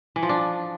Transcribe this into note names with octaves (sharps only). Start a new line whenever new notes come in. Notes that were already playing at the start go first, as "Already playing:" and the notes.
E3
F3
D4